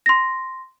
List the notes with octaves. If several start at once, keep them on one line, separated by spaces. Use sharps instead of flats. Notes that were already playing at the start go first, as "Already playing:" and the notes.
C6 A#6